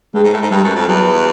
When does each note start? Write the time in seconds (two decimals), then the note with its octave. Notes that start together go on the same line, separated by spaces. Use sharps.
0.15 G2 G#3
0.24 G#2
0.33 A2
0.42 G#2
0.51 G2 G3
0.64 F#2
0.76 F2
0.88 E2 F#3